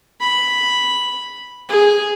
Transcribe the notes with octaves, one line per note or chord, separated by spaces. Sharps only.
B5
G#4